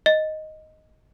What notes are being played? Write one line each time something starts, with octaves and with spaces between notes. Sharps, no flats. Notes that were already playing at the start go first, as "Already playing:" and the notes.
D#5